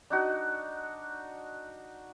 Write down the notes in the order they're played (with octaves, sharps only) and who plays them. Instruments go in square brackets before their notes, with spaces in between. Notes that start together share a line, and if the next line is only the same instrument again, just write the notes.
[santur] D4 D#4 F#4